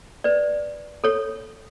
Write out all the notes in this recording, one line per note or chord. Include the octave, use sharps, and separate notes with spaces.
B4 D5
A4 C#5